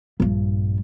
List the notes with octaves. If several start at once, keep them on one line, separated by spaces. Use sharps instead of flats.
A#1 G2